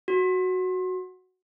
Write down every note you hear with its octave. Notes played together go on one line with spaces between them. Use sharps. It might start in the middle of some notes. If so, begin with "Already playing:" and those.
F#4